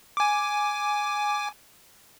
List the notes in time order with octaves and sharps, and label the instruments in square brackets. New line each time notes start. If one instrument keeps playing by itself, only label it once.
[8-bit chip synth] G#5 D6